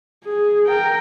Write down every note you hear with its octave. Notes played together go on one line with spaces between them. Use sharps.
G#4
A#4 G5